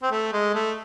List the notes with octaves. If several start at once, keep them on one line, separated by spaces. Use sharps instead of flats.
C4
A3
G#3
A3